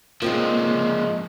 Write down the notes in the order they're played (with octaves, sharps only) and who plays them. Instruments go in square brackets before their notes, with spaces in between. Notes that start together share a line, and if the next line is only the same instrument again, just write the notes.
[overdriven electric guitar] F3 G#3 [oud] A#3 C4 F4